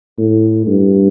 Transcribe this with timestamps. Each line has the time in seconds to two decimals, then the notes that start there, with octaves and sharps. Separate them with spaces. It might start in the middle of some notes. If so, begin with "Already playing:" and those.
0.18 A2
0.67 G2